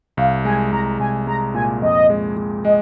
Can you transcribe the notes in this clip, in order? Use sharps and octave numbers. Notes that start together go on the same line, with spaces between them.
C2 F5
G#3 G#5
C2 A#5
C2 G#5
G#3 A#5
A#2 G#5
F2 D#5
G#3
G#3
G#3 D#5